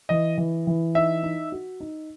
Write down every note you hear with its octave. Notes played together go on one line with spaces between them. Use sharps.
E3 D#5
E3
E3
D#4 E5
D#4
F#4
D#4